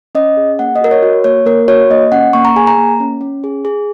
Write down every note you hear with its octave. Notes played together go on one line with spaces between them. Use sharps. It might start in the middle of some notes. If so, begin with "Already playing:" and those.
C#4 D#5
G#4
A#3 F#5
D#5
F#4 A#4
C#5
F#4
A#3 C#5
A#3 A#4
F#4 C#5
A#3 D#5
C#4 F#5
A#3 C#6
A#5
G#4 G#5
A#5
A#3
C#4
C#4
G#4
G#4